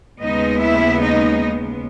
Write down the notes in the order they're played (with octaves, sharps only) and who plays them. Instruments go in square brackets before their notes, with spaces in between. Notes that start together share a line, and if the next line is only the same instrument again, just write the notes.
[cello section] D#2 C#3 G#3 B3 D#4 D#5
E4 E5
D#4 D#5